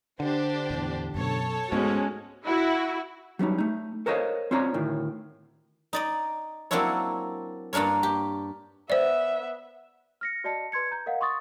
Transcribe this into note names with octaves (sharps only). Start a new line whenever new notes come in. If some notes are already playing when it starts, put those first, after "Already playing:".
D3 D4 G4 C5
E2 A2
F#2 B2 A4 C#5 A5
G#2 G#3 A3 B3 C#4 F#4
E4 F#4
F#3 G3 C#4 D#4
A3 D#4
A4 A#4 C5 C#5 D#5 F5
C4 C#4 F4 C#5 D5 A#5
D2 A2 D#3
D#4 D5 D#5
F#3 A#3 C4 D4 E4 C#5
G2 A#3 D4 A#4 C#5
G4
B3 C5 D5 E5
F6 A#6 C#7
F#4 D5 D#5 A5 C#7
B4 C6 G#6 C#7
A#5 G6
A#4 D#5 F5 F#5
C6 C#6 D#6 A6